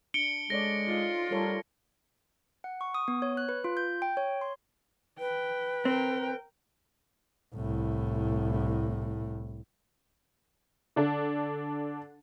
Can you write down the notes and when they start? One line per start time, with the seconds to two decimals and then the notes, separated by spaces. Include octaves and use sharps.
0.14 D4 C#7 D7 G7
0.50 G#3 A4 C#5 D5 A#6
0.88 D#4 F4 D#5
1.31 G3 A4 A#4 C#5
2.64 F#5
2.81 C#6
2.94 D#6
3.08 B3
3.22 C#5
3.37 F#6
3.49 B4
3.64 F4
3.77 G6
4.02 G5
4.17 C#5
4.41 C6
5.19 B4 G5
5.85 C4 A#4 G5
7.54 C2 A2
10.96 D3 D4 A4